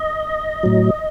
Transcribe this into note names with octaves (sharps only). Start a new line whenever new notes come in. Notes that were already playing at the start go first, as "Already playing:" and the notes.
Already playing: D#5
A2 F#3